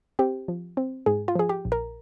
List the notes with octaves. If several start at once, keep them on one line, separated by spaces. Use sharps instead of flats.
C4 G4
F3
C4
G#2 G#4
F4
F3 G#4
G4
A#1
A#4